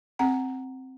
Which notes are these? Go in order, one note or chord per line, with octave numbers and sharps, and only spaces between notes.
C4 F#5 A#5